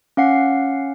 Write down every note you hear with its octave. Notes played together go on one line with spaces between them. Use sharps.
C#4 F5 F#5 C7